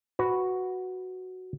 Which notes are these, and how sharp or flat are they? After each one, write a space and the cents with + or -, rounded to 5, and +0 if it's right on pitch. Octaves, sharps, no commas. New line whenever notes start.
F#4 +0 B4 +0